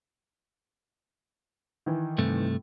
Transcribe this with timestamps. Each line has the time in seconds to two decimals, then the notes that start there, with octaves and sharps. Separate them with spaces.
1.86 D#3 E3
2.18 G2 C3 A3